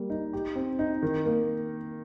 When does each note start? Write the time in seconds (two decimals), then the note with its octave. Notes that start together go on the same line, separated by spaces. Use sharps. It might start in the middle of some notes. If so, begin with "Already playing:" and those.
Already playing: G3 A#3
0.10 D#4
0.33 G4
0.56 C4
0.79 D#4
1.02 D#3
1.25 A#3